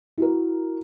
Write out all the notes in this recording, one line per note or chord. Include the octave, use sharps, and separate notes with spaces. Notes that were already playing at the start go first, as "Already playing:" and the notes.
E4 F#4 A#4